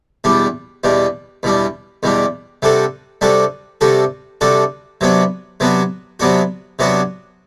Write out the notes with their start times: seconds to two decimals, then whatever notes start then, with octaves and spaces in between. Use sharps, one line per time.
0.24 E2 B2 G3 D4
0.84 E2 B2 G3 D4
1.43 E2 B2 G3 D4
2.03 E2 B2 G3 D4
2.62 C3 G3 D4 F#4 A4
3.21 C3 G3 D4 F#4 A4
3.81 C3 G3 D4 F#4 A4
4.41 C3 G3 D4 F#4 A4
5.01 C3 F#3 B3 D4 F#4
5.60 C3 F#3 B3 D4 F#4
6.20 C3 F#3 B3 D4 F#4
6.79 C3 F#3 B3 D4 F#4